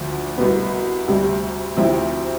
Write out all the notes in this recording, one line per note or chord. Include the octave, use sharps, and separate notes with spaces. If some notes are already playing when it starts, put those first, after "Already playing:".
Already playing: D2 D3 F3
C2 B2 B3
D2 C3 G3
D2 C3 F3 C4 E4